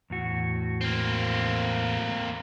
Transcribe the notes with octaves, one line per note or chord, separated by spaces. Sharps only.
E2 A2 F#4
A#3 C4